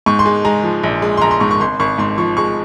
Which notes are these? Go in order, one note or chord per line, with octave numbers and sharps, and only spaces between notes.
G#2 C#6
C6
G#3
G#3 A#5
F3
A#1
G#3
C6
A#1 A#5
C6
G#2 C#6
C#6
G#1 C6
G#1 C#6
G#2 C6
F3 C#6
G#3 C#6